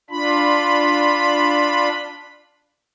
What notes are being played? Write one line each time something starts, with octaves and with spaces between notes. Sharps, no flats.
D4 F4 B5